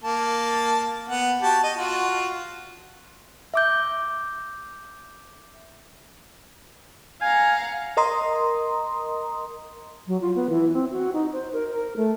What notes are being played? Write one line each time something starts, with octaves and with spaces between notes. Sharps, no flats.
A#3 A5
B3 F#5
F#4 G4 A5
D#5
F4 F#4
E5 D6 G6
F5 F#5 G#5 A#5
A#4 D#5 A#5 C6 D#6
F#3
F4
B3
E3
C4
F#4
D#4
C5
A#4
A#4
A3